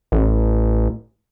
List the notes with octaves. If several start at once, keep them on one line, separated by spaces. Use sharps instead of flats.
A1